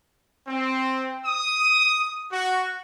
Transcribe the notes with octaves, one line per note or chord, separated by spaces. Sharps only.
C4
D#6
F#4